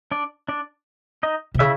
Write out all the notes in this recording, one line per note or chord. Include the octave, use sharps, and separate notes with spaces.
D4 D5
D4 D5
D#4 D#5
C3
C#3 E4 E5